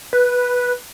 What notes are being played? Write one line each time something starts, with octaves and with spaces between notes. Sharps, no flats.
B4